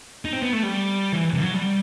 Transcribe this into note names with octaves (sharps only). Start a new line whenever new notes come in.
D#4
C4
B3
A3
G3
E3
C3
F#3
G3